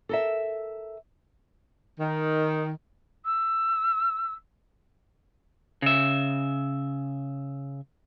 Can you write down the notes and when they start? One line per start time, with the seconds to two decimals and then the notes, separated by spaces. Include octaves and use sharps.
0.09 A4 A#4 E5
1.99 D#3
3.25 E6
5.82 C#3 E5